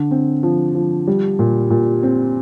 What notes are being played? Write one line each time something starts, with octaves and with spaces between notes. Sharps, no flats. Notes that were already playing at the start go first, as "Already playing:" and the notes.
Already playing: D3
C4
F3
F3
G3
A#2
A#2
C4